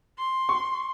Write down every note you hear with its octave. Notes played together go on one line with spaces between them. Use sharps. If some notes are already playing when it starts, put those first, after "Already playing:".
C6
C#6